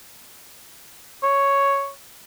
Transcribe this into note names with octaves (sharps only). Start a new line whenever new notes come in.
C#5